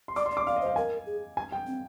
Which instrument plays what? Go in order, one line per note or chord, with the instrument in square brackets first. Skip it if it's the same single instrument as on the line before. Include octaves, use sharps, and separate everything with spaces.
[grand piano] C6
[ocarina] D5 [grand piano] D6
[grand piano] C6
[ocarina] D5
[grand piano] D6
[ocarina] D5 [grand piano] F5
[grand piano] D#5
[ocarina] C5 [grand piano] F5
[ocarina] A#4 [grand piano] G#5
[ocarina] G#4
[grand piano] G#5
G5
[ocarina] C4